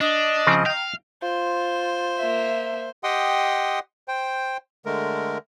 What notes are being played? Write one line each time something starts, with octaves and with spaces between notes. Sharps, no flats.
D4 D#5
C#3 F3 C4
F5 G5 A#5
F4 C5
A#3 E5
G4 D#5 F#5 G5 C6 D#6
C5 G5
D3 G#3 A3 A#4